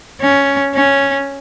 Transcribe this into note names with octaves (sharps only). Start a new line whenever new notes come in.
C#4
C#4